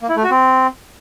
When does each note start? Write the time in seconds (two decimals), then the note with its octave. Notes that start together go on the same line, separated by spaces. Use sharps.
0.02 A#3
0.09 E4
0.16 A3
0.23 F#4
0.30 C4